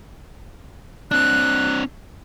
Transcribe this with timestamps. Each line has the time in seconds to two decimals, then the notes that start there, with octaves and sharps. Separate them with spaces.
1.11 C4 D4 F#6